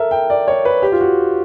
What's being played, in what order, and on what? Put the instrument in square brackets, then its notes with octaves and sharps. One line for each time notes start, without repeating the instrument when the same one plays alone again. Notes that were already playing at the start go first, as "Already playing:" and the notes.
Already playing: [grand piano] A4 A#4 E5
G5
D5
C#5
B4
G4
F4
F#4